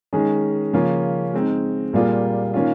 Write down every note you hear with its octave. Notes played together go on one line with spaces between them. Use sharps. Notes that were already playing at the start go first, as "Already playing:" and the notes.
D#3 G#3 C#4 G#4
C#3 F3 A#3 C#4 F4
G#3 C4 D#4
A#2 G3 A#3 F4 G#4
D#3 A#3 C#4 F4